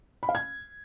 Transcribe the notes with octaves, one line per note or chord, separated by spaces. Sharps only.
B5
F5
G#6